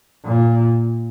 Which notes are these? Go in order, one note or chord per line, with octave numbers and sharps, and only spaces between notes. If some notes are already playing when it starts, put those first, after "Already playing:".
A#2